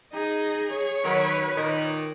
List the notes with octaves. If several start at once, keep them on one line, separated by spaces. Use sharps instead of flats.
D#4 G#4
C#5
D#3 F#3 B4
A#2 D#3